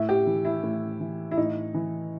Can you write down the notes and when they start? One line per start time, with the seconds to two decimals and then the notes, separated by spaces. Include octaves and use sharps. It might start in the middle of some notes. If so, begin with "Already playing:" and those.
Already playing: A2 E5
0.09 G4
0.27 E3
0.45 E4
0.63 A2
1.00 E3
1.31 E4
1.37 A2 D#4
1.74 E3